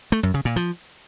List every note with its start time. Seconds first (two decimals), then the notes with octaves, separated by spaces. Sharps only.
0.12 A3
0.23 F#2
0.34 C#3
0.45 A#2
0.56 F3